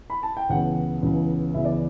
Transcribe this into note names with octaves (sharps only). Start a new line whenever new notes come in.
B5
A5
G5
C#2 C#3 E3 B3 F#5
C#2 C#3 E3 B3
C#2 C#3 E3 B3 E5
D5